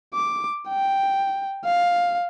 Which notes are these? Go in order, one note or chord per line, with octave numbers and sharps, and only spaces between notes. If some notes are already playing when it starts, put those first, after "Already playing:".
D6
G5
F5